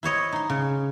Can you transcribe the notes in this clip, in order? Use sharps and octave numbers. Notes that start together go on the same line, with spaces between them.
E4 C5 C#5 D#5
D#4 C6
C#3